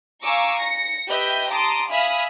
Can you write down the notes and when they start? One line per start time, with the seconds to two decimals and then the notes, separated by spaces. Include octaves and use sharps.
0.23 F5 G#5 A#5 C#6 D6 E6
0.58 A#6 C#7
1.09 G4 B4 D#5 E5 G6
1.51 A5 A#5 C6 D6 D#6
1.90 E5 F5 G#5 B5 D#6 F6